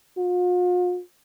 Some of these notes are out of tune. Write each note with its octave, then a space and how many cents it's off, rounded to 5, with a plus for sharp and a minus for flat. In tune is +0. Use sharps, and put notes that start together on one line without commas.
F4 +45